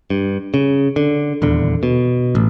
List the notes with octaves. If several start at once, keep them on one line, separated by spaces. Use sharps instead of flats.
G2
C#3
D3
D#1 E2 D3
B2
A1